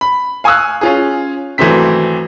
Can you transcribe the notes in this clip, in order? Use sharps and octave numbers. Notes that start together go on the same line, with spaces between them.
B5
F5 G#5 C#6 D#6 E6 F#6
C#4 F4 G#4
G#1 E3 F#3 A3 C4 B6